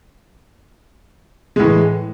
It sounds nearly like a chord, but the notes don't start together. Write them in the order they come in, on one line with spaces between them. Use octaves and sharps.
G#3 A2 E3